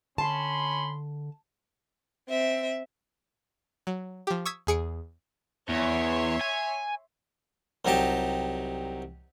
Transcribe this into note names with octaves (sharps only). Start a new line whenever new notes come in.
D3 C#4 A5 B5 C6
C4 E5
F#3
F3 G4
C#6 D#6 E6 G#6 B6
E2 G#4 C#7 D7
E2 C#5 E5 C6
G#5
C2 F#3 D#4 G4 A5